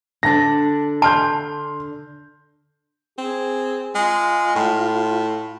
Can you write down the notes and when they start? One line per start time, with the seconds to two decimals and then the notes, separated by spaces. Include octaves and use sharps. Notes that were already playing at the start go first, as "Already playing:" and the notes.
0.23 D3 D4 A5 A#6
1.02 A5 C6 F6 G6
3.18 C4 G#4
3.95 G#3 F4
4.55 A2